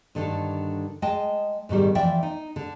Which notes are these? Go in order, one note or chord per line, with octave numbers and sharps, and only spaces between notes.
G2 D3 D#3 A4
G#3 D#5 G5 A5
G#2 B2 D#3 G3
E3 F3 D5 E5 G5
D#4
D3